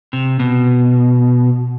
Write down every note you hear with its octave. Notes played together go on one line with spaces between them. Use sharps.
C3
B2